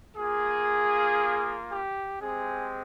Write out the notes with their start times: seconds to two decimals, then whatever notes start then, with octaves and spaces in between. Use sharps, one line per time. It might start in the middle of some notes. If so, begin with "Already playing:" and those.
0.17 A#3 F4 G#4
1.70 G4
2.21 G#3 C4 G4 G#4